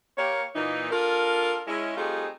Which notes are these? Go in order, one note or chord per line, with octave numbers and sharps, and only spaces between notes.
A#3 G4 C#5
A#2 E3 D#4
D4 F4 A4 A#4
G#3 C#4 E4
G3 A3 C4 D#4 F4 G#4